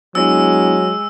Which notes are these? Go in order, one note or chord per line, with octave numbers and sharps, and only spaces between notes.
F#3 G#3 B3 D4 E4 E6